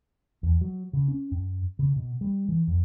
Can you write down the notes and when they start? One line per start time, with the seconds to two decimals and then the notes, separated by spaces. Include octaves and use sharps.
0.43 E2
0.61 F#3
0.93 C#3
1.08 C#4
1.32 F#2
1.79 C#3
1.96 B2
2.21 G3
2.49 E3
2.68 F2